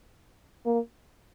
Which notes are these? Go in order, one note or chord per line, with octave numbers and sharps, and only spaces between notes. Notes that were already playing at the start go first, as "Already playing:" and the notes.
A#3